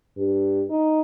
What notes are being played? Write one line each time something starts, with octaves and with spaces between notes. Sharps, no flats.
G2
D#4